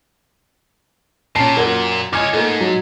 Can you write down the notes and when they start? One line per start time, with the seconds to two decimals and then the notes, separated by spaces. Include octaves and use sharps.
1.36 A#2 C#4 A5 C7
1.57 F#2 A#4 F#5 G#6
2.13 C#2 C#5 D#5 G#5 D6 F6 G#6
2.33 G#2 A3 A#3
2.61 F#3